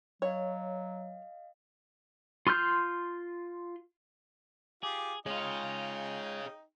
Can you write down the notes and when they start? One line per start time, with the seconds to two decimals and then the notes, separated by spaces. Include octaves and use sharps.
0.22 F#3 C#5 D#5 F5
2.47 F4 C6 F6 G6
4.83 F4 G4 G#4 D6
5.26 G#3 D#4 F4 G#4 C#5 D#5 G5